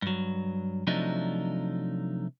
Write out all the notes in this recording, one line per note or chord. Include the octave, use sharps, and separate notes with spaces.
G2 F#3
C3 F3 F#3 A3 D4 D#4